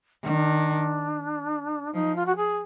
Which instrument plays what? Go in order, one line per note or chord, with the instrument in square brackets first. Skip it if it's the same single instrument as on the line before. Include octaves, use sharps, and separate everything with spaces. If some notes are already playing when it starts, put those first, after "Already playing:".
[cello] D#3 [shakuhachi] D4
[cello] F3 [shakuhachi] D#4
[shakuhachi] F4
F#4
G#4